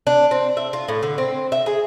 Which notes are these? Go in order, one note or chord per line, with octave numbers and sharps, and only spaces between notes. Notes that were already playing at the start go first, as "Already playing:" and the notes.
D4
C4
E5
F4
A2
D3
C4
E5
G#4